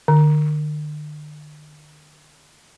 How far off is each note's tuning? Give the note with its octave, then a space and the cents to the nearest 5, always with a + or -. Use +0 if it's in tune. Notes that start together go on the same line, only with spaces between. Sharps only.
D3 +45